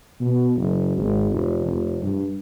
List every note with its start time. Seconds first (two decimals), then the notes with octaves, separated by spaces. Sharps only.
0.21 B2
0.57 F#1
0.97 G#1
1.32 F1
1.66 F1
2.03 G2